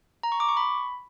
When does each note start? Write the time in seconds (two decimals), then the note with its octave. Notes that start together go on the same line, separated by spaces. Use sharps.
0.23 A#5
0.32 C#6
0.40 D6
0.48 C#6
0.57 B5